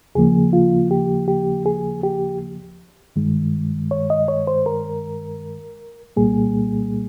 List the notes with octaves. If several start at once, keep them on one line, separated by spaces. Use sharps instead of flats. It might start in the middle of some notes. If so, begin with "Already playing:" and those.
D#2 C#3 F3 A#3 G#4
F4
G4
G4
G#4
G4
G2 D#3 G#3
C#5
D#5
C#5
C5
A#4
C2 A#2 G3 A#3 G#4